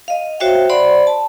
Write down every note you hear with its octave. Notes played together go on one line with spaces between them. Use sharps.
D#5 F5
F#4 C5 C#5 E5 F5 G5
C5 D5 F#5 B5 C6
A5